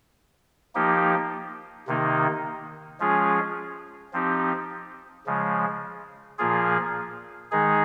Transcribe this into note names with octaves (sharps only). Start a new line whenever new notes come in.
F3 A#3 D#4 G4
C3 D#3 A#3 D#4
F3 G#3 C#4 F4 G#4
F3 C4 D#4 G4
C#3 F3 G#3
A#2 F3 A#3 F4 G#4
D#3 G#3 D#4 G#4